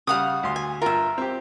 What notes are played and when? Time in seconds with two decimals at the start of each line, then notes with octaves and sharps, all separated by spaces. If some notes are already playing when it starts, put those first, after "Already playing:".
0.07 C#3 G3 F5 F#5 D#6
0.43 D2 C6
0.56 G#5
0.82 G2 F4 A#4 E5
1.18 C4 G4